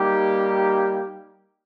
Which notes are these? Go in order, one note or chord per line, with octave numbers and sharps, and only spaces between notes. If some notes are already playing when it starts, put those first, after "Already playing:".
Already playing: G3 A#3 D#4 G4